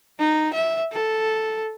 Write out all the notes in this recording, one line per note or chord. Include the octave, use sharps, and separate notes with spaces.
D#4
E5
A4